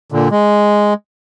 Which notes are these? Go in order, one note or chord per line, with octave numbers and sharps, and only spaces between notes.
A#2 D3
G#3